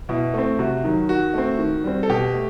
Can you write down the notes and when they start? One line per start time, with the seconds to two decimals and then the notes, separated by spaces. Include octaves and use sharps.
0.09 B2 E4
0.34 A3 C4
0.59 C3 F#4
0.84 D#3 F#3
1.09 D#3 F#4
1.34 A3 C4
1.59 D#3
1.84 G3 C4
2.03 A4
2.10 B2 G4
2.34 A3